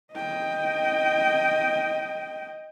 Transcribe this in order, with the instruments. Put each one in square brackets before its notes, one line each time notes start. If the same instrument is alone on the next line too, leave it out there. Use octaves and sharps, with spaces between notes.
[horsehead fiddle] D#5 G5